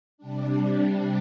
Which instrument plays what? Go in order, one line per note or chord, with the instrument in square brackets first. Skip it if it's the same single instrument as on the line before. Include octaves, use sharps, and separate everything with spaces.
[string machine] C3 G3 D4